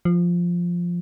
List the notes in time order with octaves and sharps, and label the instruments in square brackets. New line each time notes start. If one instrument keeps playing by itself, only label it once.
[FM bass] F3